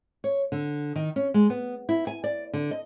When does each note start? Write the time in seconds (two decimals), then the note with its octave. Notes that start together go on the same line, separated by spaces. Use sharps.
0.24 C#5
0.52 D3
0.96 D#3
1.16 C#4
1.34 G#3
1.50 B3
1.89 E4
2.07 G#5
2.24 D5
2.54 D3
2.71 D#5